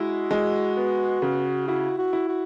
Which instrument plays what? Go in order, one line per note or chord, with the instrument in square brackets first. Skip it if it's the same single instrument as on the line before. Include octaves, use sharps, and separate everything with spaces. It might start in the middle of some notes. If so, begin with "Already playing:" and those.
Already playing: [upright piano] G#3 E4 [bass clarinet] F#4
[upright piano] G#3
B3
C#3
[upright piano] E4 [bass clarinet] F#4
[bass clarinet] F#4
[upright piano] E4
[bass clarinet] F#4